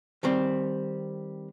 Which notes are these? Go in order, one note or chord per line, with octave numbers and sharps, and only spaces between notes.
D#3 G3 C4